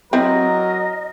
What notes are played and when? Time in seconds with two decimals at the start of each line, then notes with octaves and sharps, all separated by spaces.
0.13 F#3 C4 E4 A#4 B4 D#5